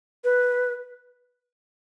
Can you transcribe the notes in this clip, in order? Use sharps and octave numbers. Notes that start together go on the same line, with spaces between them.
B4